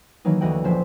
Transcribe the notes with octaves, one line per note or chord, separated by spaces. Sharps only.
D#3 E3 F#3 A#3 D#4
D2 E3 F#4 D#5 F#5 G5
A#1 F3 C#4 C5 E5 B6